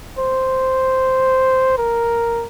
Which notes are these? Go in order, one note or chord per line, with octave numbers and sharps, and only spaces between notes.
C5
A#4